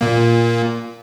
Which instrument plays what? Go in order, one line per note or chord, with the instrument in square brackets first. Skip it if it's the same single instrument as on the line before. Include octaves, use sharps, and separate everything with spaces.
[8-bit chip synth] A#2 A#3